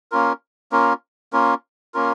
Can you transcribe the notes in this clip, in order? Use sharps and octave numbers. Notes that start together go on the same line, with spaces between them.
A#3 C#4 F4 A#4
A#3 C#4 F4 A#4
A#3 C#4 F4 A#4
A#3 C#4 F4 A#4